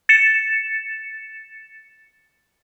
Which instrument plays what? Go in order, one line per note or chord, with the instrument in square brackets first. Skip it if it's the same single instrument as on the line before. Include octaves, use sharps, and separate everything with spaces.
[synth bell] A6 C#7 E7